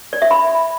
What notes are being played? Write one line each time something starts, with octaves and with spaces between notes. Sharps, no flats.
D5
E5
B5